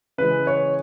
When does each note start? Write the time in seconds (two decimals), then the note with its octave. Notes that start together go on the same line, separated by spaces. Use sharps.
0.18 C#3 E3 G#3 B4
0.47 C#5